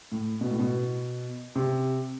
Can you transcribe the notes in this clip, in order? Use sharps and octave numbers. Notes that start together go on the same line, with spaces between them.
A2
B2
A2
B2
C3